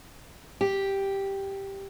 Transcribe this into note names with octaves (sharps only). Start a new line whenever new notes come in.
G4